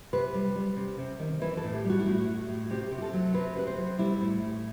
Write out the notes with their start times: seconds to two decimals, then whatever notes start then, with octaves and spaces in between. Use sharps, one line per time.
0.13 C3 B4
0.34 G3
0.56 G3
0.77 C3
0.98 C3
1.19 D#3
1.41 E3 B4
1.57 A4
1.63 A2
1.73 G4
1.84 G3
1.90 F#4
1.99 E4
2.06 A2 F#4
2.27 A2
2.49 A2
2.70 C3 G4
2.91 C3
2.98 G4
3.02 A4
3.13 F#3
3.34 C3 B4
3.56 C3 B4
3.67 C5
3.78 F#3
3.98 G3 E4
4.21 A2
4.42 A2